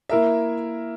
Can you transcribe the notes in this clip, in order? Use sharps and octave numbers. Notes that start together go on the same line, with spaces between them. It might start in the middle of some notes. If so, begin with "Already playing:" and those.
A#3 E4 A#4 E5